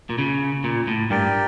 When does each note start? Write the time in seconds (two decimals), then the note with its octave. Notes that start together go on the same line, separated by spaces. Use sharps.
0.10 A#2
0.18 C#3
0.64 A#2
0.87 A2
1.10 G2 G4 A#4 D5 G5